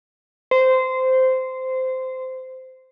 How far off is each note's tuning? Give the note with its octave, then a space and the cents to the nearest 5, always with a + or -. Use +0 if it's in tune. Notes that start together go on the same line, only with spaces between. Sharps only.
C5 -15